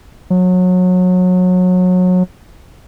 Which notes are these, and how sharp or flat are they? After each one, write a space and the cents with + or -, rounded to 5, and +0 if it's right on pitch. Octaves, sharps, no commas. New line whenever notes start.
F#3 -25